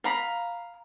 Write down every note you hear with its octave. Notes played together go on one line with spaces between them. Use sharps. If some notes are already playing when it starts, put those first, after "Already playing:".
F5 A#5 B5